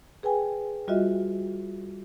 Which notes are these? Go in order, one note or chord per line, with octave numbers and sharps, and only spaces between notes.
G#4 B4 G5 G#5
G3 F4 F#4 D#5 E5